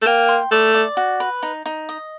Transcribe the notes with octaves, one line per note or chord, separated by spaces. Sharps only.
A3
A#3 G5
C6
A3 D5
D5
F#4
B4
D#4
D#4
D#5